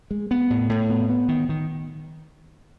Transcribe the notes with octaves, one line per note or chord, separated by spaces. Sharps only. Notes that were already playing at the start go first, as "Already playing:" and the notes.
G#3
B3
A2
A2
B3
B3
D#3
D#3